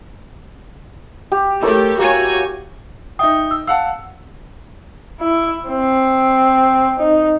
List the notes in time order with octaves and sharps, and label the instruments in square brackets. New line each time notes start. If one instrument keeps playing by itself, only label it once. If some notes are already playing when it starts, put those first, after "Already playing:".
[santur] G4
[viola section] A3 G4 [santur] E4 A#4 C#5
[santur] A#3 [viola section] F#4 C#5 G#5
[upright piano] D#4 G5 [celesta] E5 D#6
[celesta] E6
[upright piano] F5 F#5 A5 [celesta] E6
[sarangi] E4
C4
D#4